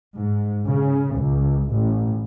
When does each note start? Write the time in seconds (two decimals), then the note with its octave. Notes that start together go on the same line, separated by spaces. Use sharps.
0.16 G#2
0.67 C#3
1.17 C#2
1.70 A1